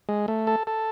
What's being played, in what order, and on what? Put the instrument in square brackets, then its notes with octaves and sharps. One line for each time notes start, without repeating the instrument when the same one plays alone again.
[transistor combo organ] G#3
A3
A4
A4